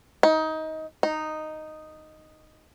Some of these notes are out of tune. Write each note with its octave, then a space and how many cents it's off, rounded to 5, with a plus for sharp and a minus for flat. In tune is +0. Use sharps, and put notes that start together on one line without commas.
D#4 +20
D#4 -5